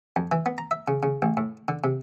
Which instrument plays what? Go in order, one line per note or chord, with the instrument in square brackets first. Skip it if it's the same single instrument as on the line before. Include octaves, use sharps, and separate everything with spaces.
[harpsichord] F2
E3
B3
A#5
E5
C#3
C#3
A1
A2
D3
C3